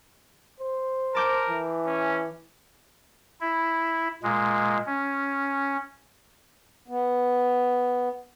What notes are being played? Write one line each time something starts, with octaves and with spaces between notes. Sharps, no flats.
C5
A#4 A5 D6 G6
E3
C#4
E4
A#2 G#3
C#4
B3